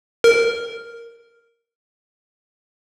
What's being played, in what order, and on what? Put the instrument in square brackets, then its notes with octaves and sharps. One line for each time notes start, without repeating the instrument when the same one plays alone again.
[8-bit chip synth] A#4